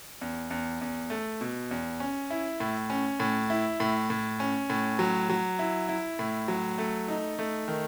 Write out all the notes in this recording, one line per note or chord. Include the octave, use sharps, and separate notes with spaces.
E2
E2
E2
A3
B2
E2
C#4
E4
A2
C#4
A2
E4
A2
A2
C#4
A2
F#3
F#3
E4
E4
A2
F#3
A3
D#4
A3
D#3